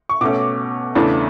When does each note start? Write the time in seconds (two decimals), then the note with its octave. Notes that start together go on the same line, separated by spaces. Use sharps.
0.09 C#6
0.21 B2 A3 C#4 D6
0.95 E2 C#3 E3 A3 D4